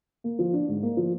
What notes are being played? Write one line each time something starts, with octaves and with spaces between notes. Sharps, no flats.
A#3
F3
D4
G#2
A#3
F3